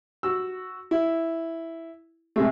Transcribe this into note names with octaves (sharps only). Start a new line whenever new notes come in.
F#4 E6
E4
C3 G#3 A3